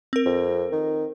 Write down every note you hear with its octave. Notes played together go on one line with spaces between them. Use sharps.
C4 A#4
F2
D#3